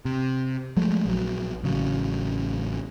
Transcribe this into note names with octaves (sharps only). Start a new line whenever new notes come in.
C3
F3 F#3 G#3 A3
A#1 F#3
A1 C#3 F#3